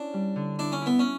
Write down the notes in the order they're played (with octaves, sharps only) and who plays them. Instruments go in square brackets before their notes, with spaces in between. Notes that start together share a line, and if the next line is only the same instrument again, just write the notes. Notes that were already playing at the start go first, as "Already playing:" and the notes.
Already playing: [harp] C#4 E4 [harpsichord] D4
[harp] G3
D3
[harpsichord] D4 [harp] E4
[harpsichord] C#4
[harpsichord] B3 [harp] E4
[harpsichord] C#4